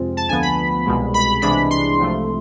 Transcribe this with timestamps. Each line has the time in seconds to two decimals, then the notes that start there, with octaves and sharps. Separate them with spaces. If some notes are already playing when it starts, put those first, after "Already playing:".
Already playing: F2 C3 G#3 C4 F4
0.17 A5
0.28 D2 D3 F3 B3 G#5
0.42 B5
0.86 C2 B2 G#3
1.14 B5
1.42 C2 C3 E3 G#3 D4 B5
1.70 C6
1.99 C2 C3 F3 A3